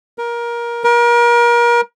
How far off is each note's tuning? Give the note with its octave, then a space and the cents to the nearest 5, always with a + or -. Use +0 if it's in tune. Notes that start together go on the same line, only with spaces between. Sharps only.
A#4 +20
A#4 +35